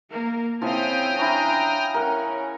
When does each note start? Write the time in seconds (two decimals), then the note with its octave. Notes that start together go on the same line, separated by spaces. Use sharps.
0.11 A#3 A#4
0.61 C#3 F3 C4 E4 G5 D#6 F6
1.18 C#4 D4 E4 A#5
1.94 C#4 A#4 F#5